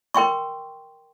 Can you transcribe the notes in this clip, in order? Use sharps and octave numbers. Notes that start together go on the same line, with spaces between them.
A#4 G5 C6 C#6